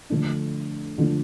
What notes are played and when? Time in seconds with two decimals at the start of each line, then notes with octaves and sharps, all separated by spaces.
0.10 D3 F3 A3 D4
0.98 D3 F3 A3 D4